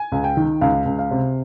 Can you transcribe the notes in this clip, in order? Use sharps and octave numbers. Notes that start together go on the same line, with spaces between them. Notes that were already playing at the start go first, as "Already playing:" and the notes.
Already playing: G#5
C#2
G5
D#3
C#2 F5
C#2
F5
C3